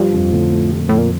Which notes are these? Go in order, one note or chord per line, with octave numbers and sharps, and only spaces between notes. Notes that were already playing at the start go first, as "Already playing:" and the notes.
Already playing: G2 F3
F2
A2 D3
A3
C3 F3
A#2
F2 A2
A#2